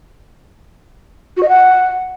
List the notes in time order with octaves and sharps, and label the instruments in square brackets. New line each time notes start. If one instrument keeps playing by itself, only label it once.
[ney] F#4
D#5
F#5